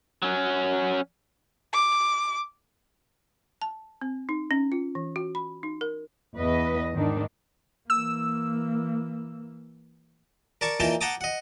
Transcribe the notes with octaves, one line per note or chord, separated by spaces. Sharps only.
F#3 C#4
D6
A5
C4
D#4
C#4
F4
E3
F#4
B5
D#4
A#4
E2 B4 D#5
G#2 D#3 D4
E3 A#3 E6
A#4 D5 A5 C#6
A#2 E3 D#4 A#4 G5 A5
F#5 G5 A5 A#5 D6 D#6
D#5 F#5